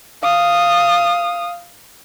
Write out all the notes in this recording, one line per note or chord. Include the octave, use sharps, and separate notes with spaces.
F5 D#6